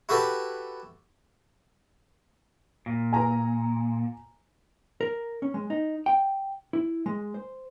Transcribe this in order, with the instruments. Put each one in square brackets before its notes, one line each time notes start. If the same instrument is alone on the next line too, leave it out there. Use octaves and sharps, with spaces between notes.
[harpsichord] E4 F#4 G4 A4 B4
[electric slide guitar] A#2
[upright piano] G#5 A#5
[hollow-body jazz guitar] A#4
C#4
G#3
D#4
G5
E4
G#3
C5